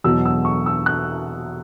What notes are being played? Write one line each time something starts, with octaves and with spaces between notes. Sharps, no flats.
E2 B2 F#3 E6
E6
C#6
E6
F#6